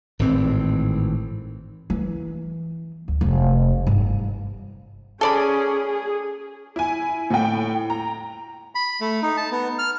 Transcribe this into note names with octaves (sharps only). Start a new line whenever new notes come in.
G#1 A2 E3 C4
E3
D2
F1
G1 D#4
C#4 G#4 A4 D5 B5
G#4
E4 G#5
A2 G5
A#5
B5
A3
D#4
A5
B3
F6